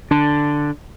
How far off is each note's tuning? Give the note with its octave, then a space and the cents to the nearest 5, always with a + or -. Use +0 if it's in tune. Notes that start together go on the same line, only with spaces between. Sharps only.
D3 +0 D4 +0